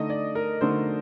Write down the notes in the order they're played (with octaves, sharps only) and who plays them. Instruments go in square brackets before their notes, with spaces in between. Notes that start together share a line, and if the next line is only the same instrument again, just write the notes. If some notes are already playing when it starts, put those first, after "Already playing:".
Already playing: [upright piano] D3 A3 D#4 [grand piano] D#5
[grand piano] D5
A#4
[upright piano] D3 A3 D#4 [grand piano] C5